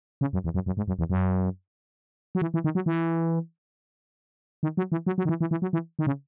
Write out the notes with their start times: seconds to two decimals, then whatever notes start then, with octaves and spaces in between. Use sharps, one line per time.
0.21 C#3
0.33 F#2
0.44 E2
0.54 F#2
0.66 F#2
0.77 G#2
0.88 F#2
0.99 E2
1.10 F#2
2.35 F#3
2.42 E3
2.54 E3
2.64 D#3
2.75 F#3
2.86 E3
4.63 D#3
4.77 F#3
4.92 E3
5.07 F#3
5.18 F#3
5.25 D#3
5.29 E3
5.41 E3
5.51 E3
5.62 F#3
5.73 E3
5.99 D#3
6.07 C#3